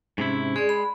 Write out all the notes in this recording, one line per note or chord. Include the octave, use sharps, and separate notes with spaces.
G#2 C3 C#4 E4
G#3 G#4 D5
B5